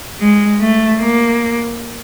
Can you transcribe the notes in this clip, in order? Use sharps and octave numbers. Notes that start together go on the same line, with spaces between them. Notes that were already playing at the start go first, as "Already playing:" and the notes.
G#3
A3
A#3